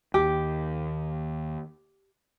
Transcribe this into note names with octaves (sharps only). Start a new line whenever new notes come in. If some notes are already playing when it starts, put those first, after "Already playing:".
D#2 D#3 G4